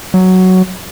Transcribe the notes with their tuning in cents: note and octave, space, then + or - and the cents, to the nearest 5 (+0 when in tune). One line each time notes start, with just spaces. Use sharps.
F#3 +5